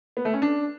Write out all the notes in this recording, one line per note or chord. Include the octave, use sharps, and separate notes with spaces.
B3
A3
C#4
D4